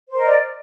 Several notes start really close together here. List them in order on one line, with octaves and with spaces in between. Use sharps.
C5 A#4 D#5 D5